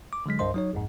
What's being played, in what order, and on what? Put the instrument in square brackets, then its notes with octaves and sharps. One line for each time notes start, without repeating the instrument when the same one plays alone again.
[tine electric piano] D6
D3 F#3 G#3 B6
C2 G2 C5 D#5 C6
F#3 D#4 C#5
A#1 F2 G#2